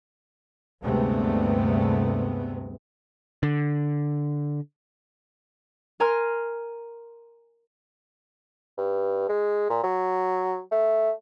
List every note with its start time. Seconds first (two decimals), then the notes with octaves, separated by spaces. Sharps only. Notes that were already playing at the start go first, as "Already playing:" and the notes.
0.83 D2 G2 C3 G#3 A3 B3
3.43 D3
6.00 A#4 G#5 A#5 C6 F6
8.78 G2
9.29 G#3
9.70 A#2
9.83 F#3
10.71 A3